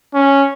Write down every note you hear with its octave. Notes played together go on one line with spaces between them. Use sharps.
C#4